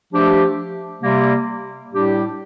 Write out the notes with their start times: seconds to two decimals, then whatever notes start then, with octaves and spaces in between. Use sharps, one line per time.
0.12 F3 A3 D4 G4
1.02 C3 G3 A#3
1.92 A2 G3 D4 G4